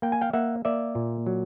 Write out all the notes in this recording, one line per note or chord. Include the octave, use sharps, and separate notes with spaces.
A#3 G5
G#5
F5 G5
A#3 E5 F#5
A#3 D5 E5
A#2
F#3